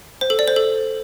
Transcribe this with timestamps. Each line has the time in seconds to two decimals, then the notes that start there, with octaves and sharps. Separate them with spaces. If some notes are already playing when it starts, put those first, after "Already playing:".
0.21 C5
0.30 A4
0.39 D5
0.48 C5
0.56 A4